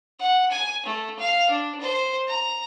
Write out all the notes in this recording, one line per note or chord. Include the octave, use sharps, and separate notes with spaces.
F#5
G#5
A3
F5
D4
C5
A#5